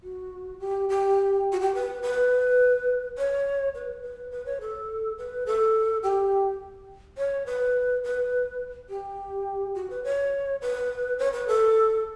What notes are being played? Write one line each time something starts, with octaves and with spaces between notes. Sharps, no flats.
F#4
G4
G4
F#4
G4
B4
B4
C#5
B4
B4
B4
C#5
A4
B4
A4
G4
C#5
B4
B4
G4
F#4
B4
C#5
B4
C#5
B4
A4